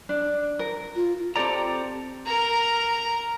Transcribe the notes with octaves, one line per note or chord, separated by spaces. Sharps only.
D4
A#4
F4
C4 G4 A4 D5 A#5
A#4 A#5